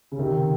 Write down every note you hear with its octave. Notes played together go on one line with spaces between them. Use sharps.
C#3
C3 D#3